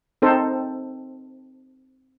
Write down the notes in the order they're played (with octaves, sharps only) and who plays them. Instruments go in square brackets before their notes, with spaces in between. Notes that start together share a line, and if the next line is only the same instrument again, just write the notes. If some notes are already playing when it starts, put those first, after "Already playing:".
[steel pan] C4 D#4 A4 C5